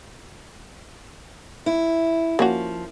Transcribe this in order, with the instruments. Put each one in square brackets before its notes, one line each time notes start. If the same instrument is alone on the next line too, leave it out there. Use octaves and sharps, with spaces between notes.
[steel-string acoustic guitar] E4
[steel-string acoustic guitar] F3 [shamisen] A#3 C#4 F#4